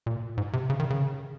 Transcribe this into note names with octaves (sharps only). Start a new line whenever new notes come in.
A#2
G#2
C3
C#3
D#3
C#3